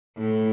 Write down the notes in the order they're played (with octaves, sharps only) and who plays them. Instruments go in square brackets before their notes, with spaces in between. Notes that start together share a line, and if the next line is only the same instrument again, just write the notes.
[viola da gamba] A2